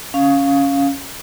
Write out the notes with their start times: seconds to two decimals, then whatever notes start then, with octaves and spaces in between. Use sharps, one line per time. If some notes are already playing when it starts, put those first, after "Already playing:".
0.14 C#4 F5